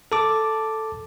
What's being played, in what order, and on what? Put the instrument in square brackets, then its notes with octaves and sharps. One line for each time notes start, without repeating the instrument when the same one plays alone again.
[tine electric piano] A4 A5 D6